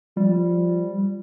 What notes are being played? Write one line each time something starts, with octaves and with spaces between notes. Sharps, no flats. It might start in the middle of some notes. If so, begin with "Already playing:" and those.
F3 G3